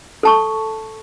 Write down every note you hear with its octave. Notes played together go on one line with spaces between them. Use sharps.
A4 A5 C#6